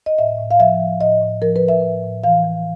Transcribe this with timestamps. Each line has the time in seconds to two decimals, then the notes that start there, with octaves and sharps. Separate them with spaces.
0.06 D#5
0.19 A2 E5
0.39 A2
0.51 F5
0.59 F3 E5
0.80 F3
1.00 A2 D#5
1.21 A2
1.42 F3 A#4
1.56 B4
1.62 F3
1.68 E5
1.83 A2
2.04 A2
2.24 E3 F5
2.44 E3